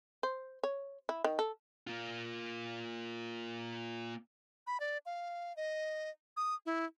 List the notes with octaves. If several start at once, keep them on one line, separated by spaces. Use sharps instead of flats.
C5
C#5
E4
D#3
A4
A#3 F4
B5
D5
F5
D#5
D#6
E4